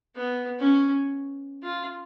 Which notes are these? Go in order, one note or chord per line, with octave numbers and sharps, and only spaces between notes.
B3
C#4
F4